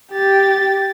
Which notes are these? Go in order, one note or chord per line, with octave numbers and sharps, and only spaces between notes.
G4 A6